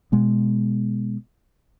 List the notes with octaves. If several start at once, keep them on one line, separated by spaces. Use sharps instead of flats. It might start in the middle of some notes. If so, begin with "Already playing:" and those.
B2 G#3 B3